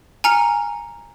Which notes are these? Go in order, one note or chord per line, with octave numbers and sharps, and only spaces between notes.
G#5 A#5 F6 C#7